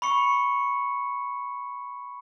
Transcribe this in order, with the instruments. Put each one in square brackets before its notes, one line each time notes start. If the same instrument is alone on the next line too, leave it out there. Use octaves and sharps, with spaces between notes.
[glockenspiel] B5 C#6 C#7